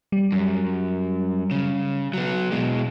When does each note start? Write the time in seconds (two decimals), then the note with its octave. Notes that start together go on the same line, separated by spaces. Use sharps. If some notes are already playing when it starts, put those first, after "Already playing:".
0.12 G3
0.32 F#2
1.51 C#3
2.13 F#3 B3
2.52 B2 G#3